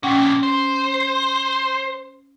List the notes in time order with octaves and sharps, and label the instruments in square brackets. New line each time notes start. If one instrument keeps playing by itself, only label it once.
[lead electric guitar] F2 A#2 [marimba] C#4 F#5 G5
[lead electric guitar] C5